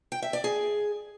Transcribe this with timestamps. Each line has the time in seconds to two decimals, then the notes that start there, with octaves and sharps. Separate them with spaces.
0.12 G5
0.22 E5
0.33 D5
0.44 G#4